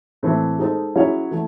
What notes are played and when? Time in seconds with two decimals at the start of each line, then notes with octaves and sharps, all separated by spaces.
0.23 A2 E3 A3 C4 E4
0.59 G#3 D#4 A4 C5
0.96 F#3 C#4 E4 G#4 C#5
1.31 E3 A3